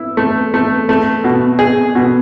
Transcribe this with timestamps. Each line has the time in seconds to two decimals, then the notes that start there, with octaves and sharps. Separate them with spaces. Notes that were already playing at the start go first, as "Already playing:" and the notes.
Already playing: E4
0.17 A3
0.54 A3
0.89 A3
1.24 B2
1.59 G#4
1.95 B2